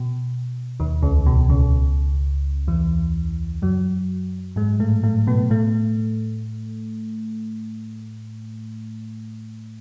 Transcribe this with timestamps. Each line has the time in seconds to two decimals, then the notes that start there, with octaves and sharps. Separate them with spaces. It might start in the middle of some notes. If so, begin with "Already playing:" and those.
Already playing: B2
0.80 D#2 D#3
1.02 C#2 C#3
1.26 B2
1.50 C#2 C#3
2.67 E2 E3
3.62 F#2 F#3
4.56 G#2 G#3
4.80 A2 A3
5.03 A2 A3
5.27 B2 B3
5.50 A2 A3